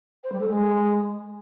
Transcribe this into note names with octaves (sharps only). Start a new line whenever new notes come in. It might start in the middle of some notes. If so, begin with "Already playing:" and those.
C5
G3
A4
G#3